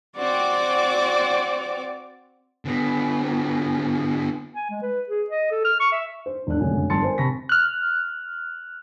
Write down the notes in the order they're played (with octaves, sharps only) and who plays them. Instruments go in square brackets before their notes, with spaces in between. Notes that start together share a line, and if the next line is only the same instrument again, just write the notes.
[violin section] C4 F#4 D6 [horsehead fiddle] D5
[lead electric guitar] D3 B3
[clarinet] G#5
G#3
B4
G#4
D#5
A4
F6
C#6
E5
[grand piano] C5
E1 D4 F#6
F1 C#2 F#2 D3 G#5
G1 A5 C6 A6 C#7
A#4 C5 G#5
C3 A5 B5 C#6 A#6 B6
[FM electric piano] F6 F#6